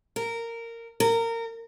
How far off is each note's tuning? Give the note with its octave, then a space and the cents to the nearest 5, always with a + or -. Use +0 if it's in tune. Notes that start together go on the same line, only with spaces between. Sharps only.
A#4 -15
A#4 -25